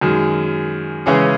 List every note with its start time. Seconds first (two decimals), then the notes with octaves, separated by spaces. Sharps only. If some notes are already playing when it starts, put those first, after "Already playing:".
0.01 F#2 D#3 G#3
1.06 C#3 E3 G#3 C#4 G#4